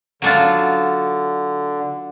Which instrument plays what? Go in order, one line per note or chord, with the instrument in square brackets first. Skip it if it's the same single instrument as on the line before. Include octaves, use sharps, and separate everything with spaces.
[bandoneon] D3 [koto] F#3 D4 F4